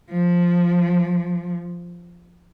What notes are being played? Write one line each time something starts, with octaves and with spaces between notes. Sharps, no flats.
F3